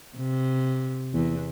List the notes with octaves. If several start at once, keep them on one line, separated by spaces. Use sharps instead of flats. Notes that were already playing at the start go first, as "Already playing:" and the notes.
C3
E2